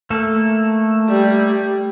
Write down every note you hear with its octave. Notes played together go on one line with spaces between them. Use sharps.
A3 A#3 A4
G3